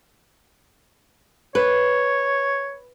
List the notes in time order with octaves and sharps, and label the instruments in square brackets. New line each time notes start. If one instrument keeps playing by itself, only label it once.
[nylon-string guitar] B4 [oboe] C#5